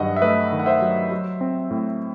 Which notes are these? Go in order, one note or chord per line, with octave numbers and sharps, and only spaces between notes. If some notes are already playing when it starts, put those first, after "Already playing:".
Already playing: G2 D#3 F#3 D#5 F#5
E5
A3 B4 D#5
D#3
F#5
C5 E5
F#3
F#3
C4
A2